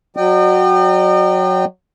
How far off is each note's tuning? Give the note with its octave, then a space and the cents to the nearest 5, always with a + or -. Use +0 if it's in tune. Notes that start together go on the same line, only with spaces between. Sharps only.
F#3 -10 D#5 -45 G5 -15